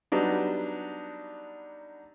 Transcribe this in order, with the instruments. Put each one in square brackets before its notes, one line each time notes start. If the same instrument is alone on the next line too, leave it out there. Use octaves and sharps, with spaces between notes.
[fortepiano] F#3 G3 B3 D4 D#4